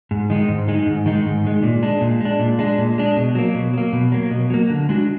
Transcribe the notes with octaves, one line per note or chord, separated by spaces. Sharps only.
G#2
D#3 G#3 D#4
G#2
D#3 G#3 D#4
G#2
D#3 G#3 D#4
G#2
D#3 G#3 D#4
A#2
G#3 D4
A#2
G#3 D4
A#2
G#3 D4
A#2
G#3 D4
B2
F#3 A#3
B2
F#3 A#3
B2
F#3 A#3
B2
F#3 A#3
D3
G#3 D4 F#4